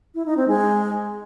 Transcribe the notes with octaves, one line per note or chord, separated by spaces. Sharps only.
E4
D#4
C4
G#3